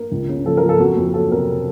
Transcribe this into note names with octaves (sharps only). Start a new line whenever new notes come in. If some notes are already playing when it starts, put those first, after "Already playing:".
Already playing: A#4
C#2
C#3
F3 A4
A#4
F3
A4
F2 F#4
F2
F#3 A4
C3 A#4